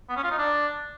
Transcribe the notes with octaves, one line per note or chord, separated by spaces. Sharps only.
B3
C#4
F4
D#4
D4